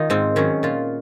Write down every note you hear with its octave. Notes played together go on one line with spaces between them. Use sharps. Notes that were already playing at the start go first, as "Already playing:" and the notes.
Already playing: D#3 D#4 F4
G#2 C4
D#3 F#3 C#4
A#2 F4